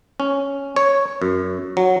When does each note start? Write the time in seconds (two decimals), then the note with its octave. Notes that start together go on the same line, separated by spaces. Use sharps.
0.20 C#4
0.76 C#5
1.22 F#2
1.77 F#3